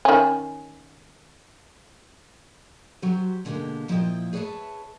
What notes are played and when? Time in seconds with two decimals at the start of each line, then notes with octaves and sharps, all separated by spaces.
0.05 D#3 C#4
3.02 F#3 F#4 G4 C5
3.45 B2 D3 G#3 A#3 G4
3.88 A#2 F3 E4 B4 D#5 G5
4.33 G#4 B4 C#5 D5 E5 A5